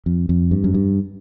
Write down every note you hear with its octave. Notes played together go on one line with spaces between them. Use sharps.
F2
F2
G2
F#2
G2